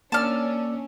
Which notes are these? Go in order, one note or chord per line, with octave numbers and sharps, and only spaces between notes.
A#3 C#4 D4 D5 A5 E6 F6